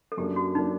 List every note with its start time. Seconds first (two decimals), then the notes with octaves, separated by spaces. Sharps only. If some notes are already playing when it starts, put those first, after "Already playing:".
0.12 A4
0.17 F#2 F#3 A#3 D4 G4
0.36 F#4
0.55 F#3 A#3 D4 D#4